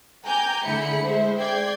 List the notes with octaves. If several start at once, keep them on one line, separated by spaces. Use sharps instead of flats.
G5 G#5 A#5 D6 G6
D3 A3 E4 G#4 B5 C#7
G#3 C5 E5
D5 G5 G#6 C7